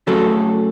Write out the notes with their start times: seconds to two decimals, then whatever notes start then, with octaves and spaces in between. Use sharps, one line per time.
0.07 C#3 F#3 A3 F#4 A4